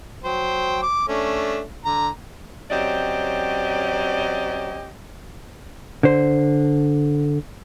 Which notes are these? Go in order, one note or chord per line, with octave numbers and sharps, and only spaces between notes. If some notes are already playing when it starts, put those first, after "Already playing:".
F#3 C5 G5
D6
A3 C#4 D4
D3 A#5
F#3 C4 C#4 G4 D5 D#5
D3 C5